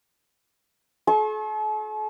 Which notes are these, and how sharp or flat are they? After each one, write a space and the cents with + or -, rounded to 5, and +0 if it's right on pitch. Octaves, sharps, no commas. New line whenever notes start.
A4 -45 C#6 -40